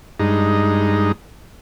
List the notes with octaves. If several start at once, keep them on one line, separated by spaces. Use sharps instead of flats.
G2 G#3 D#4